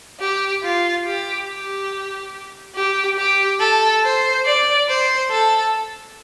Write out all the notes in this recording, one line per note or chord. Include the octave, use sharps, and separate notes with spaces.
G4
F4
G4
G4
G4
G4
A4
C5
D5
C5
A4